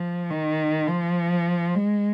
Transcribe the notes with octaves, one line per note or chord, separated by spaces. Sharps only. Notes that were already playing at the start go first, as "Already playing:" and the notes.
Already playing: F3
D#3
F3
G#3